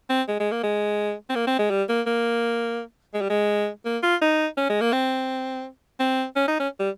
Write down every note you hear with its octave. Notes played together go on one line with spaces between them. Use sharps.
C4
G#3
G#3
A#3
G#3
C4
A#3
C4
G#3
G3
A#3
A#3
G#3
G3
G#3
A#3
F4
D#4
C#4
G#3
A#3
C4
C4
C#4
D#4
C#4
G3